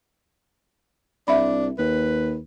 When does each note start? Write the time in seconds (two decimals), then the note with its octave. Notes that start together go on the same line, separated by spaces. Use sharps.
1.28 C2 D4 E5 B5
1.79 D#2 B4